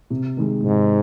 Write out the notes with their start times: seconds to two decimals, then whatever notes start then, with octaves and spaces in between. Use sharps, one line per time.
0.10 C3
0.37 D#3 G#3
0.63 G#2 C3